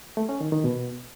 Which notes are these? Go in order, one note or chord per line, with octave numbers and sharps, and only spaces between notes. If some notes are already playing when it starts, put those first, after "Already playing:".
A3
C#4
D#3
D#3
B2